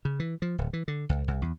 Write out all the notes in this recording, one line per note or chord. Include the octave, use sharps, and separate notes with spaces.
C#3
E3
F3
D1
E3
D3
C#2
C2
E2